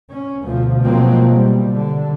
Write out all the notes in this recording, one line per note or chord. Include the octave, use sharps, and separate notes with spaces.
C#4
D2 B2 F3
B2 F3 F#3 G#3 A#3 C4
B2 G3
D3